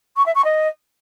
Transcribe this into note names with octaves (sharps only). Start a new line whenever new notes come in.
C#6
E5
C#6
D#5